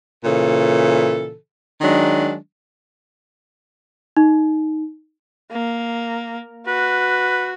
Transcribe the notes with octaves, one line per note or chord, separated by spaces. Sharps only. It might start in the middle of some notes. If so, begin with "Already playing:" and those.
A#2 C#3 E3 A4
D#3 F#3 G#3 D4
D#4
A#3
F#4 B4